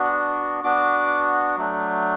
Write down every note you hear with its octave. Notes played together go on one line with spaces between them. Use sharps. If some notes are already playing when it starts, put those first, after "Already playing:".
Already playing: B3 D4 F#4
B3 D4 F#4 D6
F#3 A3 D4